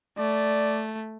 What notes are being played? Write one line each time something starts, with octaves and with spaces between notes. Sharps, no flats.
A3 D5